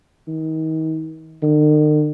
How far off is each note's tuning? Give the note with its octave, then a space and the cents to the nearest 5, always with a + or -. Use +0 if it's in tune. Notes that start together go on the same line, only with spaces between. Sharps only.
D#3 +35
D#3 -45